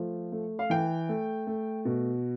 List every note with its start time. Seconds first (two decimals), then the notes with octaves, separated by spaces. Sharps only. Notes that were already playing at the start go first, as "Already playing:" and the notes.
Already playing: F3 A3
0.32 A3
0.59 F5
0.70 E3 G5
1.09 A3
1.47 A3
1.85 B2